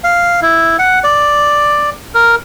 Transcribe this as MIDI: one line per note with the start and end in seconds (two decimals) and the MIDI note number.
0.04 0.40 77
0.42 0.77 64
0.79 0.99 78
1.04 1.90 74
2.14 2.36 70